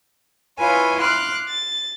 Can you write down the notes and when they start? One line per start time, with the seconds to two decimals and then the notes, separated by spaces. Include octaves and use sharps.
0.58 E4 F4 B4 C#5 F5 G#5
1.00 C6 D6 F6 F#6
1.48 A6